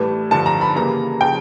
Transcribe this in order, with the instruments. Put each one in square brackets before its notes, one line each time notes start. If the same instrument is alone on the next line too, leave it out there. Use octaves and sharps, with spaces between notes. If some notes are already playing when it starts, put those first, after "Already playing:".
Already playing: [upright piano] A2 E3 G3 A5
G2 D3 F3 A5
A#5
B5
C#3 E3 G3 A#3 A#5
C#3 F3 G5